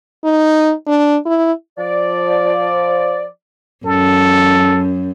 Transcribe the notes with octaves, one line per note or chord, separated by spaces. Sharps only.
D#4
D4
E4
F3 D5
F#2 A4